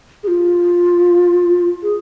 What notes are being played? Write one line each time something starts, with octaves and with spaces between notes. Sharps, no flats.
G#4
F4
G#4